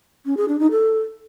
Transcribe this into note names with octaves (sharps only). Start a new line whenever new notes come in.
C#4
G#4
D4
D#4
A4